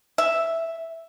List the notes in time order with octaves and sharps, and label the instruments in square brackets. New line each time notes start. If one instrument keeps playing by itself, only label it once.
[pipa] E5